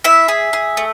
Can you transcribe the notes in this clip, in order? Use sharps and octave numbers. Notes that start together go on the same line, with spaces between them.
E4 E5
G#4
G#4
A3